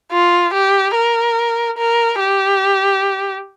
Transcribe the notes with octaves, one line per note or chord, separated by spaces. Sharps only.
F4
G4
A#4
A#4
G4